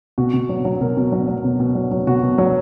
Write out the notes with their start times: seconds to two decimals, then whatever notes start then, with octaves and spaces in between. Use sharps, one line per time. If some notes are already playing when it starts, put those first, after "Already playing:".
0.18 B2 F#4
0.33 B2
0.49 F#3
0.65 F#3
0.81 B2 A#4
0.97 B2
1.12 F#3
1.28 F#3
1.44 B2
1.60 B2
1.75 F#3
1.91 F#3
2.07 B2 F#4
2.23 B2
2.38 F#3